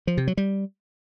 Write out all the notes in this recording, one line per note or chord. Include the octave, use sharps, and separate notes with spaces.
F3
C3
F#3
G3